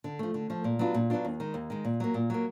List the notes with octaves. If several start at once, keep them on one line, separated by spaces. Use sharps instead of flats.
D3
F3 A3
D3
F3 A3
A#2
F#3 B3 D4 F4
A#2
F#3 B3 D4 F4
D#2
D#3 G#3
D#2
D#3 G#3
A#2
F#3 A#3
A#2
F#3 A#3